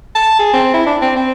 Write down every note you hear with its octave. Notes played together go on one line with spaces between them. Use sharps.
A5
G#4
C4
E4
D4
C4
C4